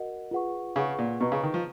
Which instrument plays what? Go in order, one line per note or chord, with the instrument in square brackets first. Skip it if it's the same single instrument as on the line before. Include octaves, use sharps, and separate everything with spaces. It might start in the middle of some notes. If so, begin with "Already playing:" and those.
Already playing: [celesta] F#4 A#4 D#5 F#5
F4 G#4 B4 F#5 C#6
[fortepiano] C#3 [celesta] F4 G#4 B4 F#5 C#6
[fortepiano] A#2
[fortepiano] B2 [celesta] B4 D#5 A#5 C#6
[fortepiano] C#3
D#3
F3